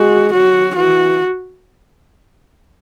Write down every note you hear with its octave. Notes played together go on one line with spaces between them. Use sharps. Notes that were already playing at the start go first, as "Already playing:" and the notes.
Already playing: G#3 F#4
F#3 F#4
E3 F#4